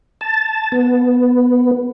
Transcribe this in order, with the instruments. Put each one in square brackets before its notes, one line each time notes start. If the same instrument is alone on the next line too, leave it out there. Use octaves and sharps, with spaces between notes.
[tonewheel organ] A5
B3